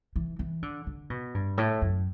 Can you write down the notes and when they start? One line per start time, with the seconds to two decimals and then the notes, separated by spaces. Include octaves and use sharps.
0.16 E3
0.39 E3
0.63 D3
0.87 D3
1.10 B2
1.35 G2
1.58 A2
1.82 F#2